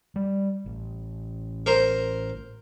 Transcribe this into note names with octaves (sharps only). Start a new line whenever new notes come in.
G3
A1
A#4 C5